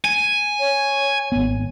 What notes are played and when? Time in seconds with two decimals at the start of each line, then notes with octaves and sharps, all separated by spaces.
0.05 G#5
0.60 C#5
1.32 G#1 B3